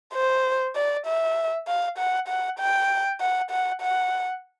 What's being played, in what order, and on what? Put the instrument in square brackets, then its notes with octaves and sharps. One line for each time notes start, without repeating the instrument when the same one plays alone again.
[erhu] C5
D5
E5
F5
F#5
F#5
G5
F#5
F#5
F#5